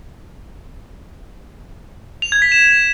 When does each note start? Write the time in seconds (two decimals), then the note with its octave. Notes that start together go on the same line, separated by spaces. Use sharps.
2.22 F7
2.32 G#6
2.42 B6
2.52 E7